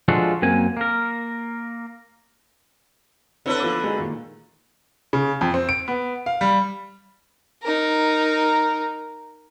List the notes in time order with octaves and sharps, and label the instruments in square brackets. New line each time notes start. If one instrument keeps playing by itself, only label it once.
[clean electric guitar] F3 G#3 D4 F4 F#4 A4
F#2 A#3 C4 G#5
A#3 A#4
[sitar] D3 A4 B4 [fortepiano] C4 E4 C#5
[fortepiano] F3 B3 D6
G#3 D#4 F#4
A#2 D#3 A#3
[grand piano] C#3
F2
C4
D7
B3
F5
G3
[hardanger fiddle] D#4 A#4